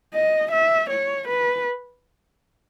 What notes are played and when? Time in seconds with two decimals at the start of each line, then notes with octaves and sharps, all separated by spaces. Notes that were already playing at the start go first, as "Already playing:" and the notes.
0.14 D#5
0.52 E5
0.90 C#5
1.28 B4